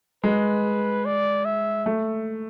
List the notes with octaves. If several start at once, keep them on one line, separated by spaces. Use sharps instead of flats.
G#3 B4
D5
E5
A3